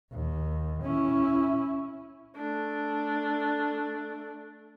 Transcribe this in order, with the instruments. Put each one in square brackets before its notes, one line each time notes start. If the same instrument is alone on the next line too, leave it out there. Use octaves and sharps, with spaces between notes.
[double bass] D#2
C#4 E4
[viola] A3 D4